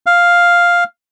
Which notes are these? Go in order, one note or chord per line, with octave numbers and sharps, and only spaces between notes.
F5